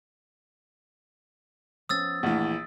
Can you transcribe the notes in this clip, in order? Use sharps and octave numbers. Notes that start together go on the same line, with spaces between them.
F3 B3 C#4 D#6 E6 A6
A#1 E3 A3 D4 F#5